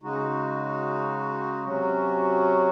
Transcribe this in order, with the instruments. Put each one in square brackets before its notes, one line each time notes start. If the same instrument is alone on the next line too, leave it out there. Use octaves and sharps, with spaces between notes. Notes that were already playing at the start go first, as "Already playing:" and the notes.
[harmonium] C#3 G#3 D#4 F#4
C3 F#3 C#4 F#4